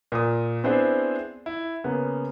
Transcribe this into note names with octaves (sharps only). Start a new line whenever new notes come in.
A#2 D#6
B3 C4 D4 E4 G#4 C5
E4
C#3 A#3 B3 C#4